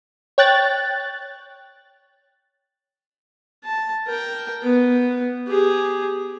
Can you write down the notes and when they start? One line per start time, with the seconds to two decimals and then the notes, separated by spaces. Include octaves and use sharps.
0.38 C#5 G5 F#6 A6
3.64 A5
4.07 A#4 G5
4.63 B3
5.48 G4 G#4